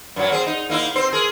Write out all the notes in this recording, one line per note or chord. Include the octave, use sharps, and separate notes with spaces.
F#2 F#3
C4 G#4
D#4
A#3 D#4 E4
C4 C5
G#4 A#4